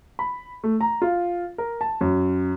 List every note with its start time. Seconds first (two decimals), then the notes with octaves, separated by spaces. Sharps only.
0.19 B5
0.64 A3
0.81 A#5
1.02 F4
1.58 A#4
1.81 A5
2.01 F#2